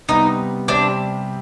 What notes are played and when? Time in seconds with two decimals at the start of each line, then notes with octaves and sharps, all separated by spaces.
0.09 C3 G3 B3 D#4
0.68 C3 G3 C4 D4